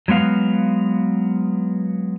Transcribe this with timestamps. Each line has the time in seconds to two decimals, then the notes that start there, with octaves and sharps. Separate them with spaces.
0.08 F#3 G#3 B3 F5